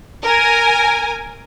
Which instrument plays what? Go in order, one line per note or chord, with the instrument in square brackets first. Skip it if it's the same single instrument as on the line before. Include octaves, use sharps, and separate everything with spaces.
[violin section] A#4 G#5